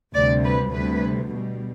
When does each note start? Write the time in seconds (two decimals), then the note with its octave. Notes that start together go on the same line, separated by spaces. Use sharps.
0.15 D2 C3 G3 D5
0.44 B4
0.72 D2 C3 G3 B4
1.29 B2 G3